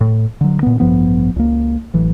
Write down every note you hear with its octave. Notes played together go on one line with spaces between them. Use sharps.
A2
D3 F#3
A#2 B3
A1 G2 F3 B3
C#2 A#3
A1 E3 F#3